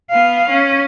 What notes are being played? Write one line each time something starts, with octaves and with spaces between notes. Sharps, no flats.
B3 F5
C#4